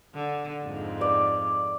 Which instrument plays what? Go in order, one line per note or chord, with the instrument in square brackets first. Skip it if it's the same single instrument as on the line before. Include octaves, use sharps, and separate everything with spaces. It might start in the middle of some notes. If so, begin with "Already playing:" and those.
[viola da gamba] D3
F2 G#2
[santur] D5